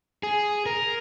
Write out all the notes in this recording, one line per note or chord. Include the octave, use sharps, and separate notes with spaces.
G#4
A#4